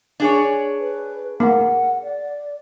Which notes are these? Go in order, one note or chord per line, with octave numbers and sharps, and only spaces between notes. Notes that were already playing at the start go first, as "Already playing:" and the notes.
D4 G#4 C#5
B4
A#3 F#5
D5